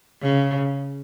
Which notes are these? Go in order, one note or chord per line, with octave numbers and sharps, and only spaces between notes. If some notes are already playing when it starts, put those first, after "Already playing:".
C#3